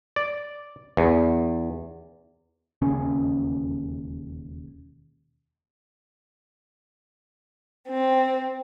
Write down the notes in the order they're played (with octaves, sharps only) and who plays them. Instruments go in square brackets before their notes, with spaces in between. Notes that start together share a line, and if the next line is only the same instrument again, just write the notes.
[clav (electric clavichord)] D5
E2
[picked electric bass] E1 D#2 C#3 C#4
[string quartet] C4